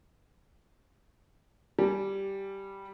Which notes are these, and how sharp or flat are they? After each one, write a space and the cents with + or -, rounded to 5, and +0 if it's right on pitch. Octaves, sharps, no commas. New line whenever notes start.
G3 -5 G#5 +15